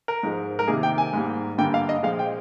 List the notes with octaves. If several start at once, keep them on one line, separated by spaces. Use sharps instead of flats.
A#4
G#2 F3 G#3
A#4
C3 D#3 A#3 G#4
G5
G#5
G#2 G3 A#3
G2 D3 G3 A#3 G5
F5
D#5
A#2 F3 G#3 F5
G5